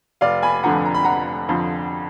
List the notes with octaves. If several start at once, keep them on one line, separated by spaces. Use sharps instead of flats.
F1 D5 F5
G#5 B5
F2 D3 F3 F#5 A#5
A#5
B5
F1 F#5 A#5
F2 D3 F3